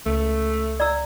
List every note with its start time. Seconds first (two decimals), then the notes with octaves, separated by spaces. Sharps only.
0.06 C#2 A3
0.80 D5 A#5 E6